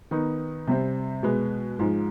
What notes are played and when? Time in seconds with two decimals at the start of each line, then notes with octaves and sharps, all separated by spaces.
0.11 D#3 B3 D#4
0.67 C3 G3 C4
1.23 B2 G#3 B3
1.79 G#2 F3 G#3